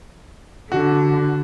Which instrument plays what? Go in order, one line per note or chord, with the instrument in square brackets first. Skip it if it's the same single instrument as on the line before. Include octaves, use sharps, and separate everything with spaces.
[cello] D3 [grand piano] F#4